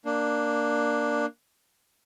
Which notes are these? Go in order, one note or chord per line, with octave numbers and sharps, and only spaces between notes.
A#3 D4